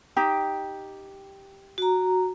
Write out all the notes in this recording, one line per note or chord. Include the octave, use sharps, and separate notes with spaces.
D#4 G4 G5
F#4 A#5